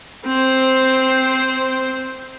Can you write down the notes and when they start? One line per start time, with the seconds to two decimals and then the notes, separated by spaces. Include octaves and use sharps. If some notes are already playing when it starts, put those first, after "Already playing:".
0.24 C4 C5